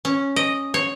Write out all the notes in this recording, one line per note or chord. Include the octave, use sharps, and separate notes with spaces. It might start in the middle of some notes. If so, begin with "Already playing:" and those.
C#4
D#5
C#5